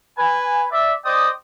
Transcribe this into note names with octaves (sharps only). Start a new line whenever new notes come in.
B4 G#5
D5 E5
C5 D5 D#5 G5 D#6